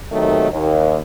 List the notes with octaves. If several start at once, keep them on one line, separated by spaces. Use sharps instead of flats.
D#2 C3 D#3 F#3 A3 D#5
D#2